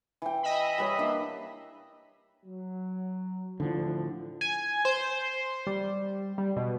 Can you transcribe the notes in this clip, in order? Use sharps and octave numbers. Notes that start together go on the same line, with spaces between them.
E3 G5
D#5 E5 B5
G3 B4 C#5
A#3 D4
F#3
D2 A2 D3 F3 D4
G#5
C5
G3
G3
B2